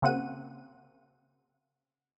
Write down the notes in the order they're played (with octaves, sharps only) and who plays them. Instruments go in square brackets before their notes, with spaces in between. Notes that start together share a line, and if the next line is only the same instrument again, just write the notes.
[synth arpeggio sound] C#3 A#3 C4 F#4 F#5 D#7